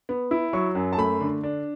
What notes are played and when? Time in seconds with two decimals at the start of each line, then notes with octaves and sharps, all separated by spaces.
0.09 B3
0.31 E4
0.53 F#3 C#6
0.75 F#2
0.93 A5
0.97 A3 B5
1.20 D3
1.43 D4